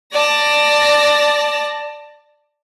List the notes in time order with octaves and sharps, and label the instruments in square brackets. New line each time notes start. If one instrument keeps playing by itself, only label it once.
[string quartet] D5 A5 A#6